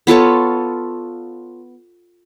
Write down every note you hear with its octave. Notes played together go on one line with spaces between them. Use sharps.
B3 F4 A4 C#5